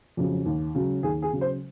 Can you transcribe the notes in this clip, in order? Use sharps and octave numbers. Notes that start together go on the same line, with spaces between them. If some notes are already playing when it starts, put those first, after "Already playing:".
F2 C#3 F#3
D#2
C#3 F#3
D#2 G#4
G#4
C#3 F#3
C5